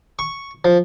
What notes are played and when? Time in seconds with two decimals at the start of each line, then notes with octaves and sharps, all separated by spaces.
0.19 C#6
0.65 F3